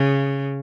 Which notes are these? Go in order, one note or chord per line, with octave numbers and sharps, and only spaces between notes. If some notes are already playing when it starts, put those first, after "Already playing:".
Already playing: C#3